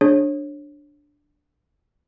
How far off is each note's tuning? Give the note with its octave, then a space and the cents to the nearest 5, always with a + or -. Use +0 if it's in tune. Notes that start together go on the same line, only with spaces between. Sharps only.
D4 +0 G#4 +0 C#5 -30